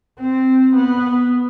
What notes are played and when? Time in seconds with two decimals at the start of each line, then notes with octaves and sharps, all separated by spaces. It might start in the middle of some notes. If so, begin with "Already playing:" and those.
0.20 C4
0.76 B3